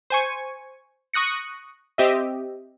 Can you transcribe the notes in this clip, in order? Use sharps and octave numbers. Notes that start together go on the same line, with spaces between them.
C5 G#5 C#6
C#6 D#6 F#6 A#6 C#7
C4 G4 D#5 E5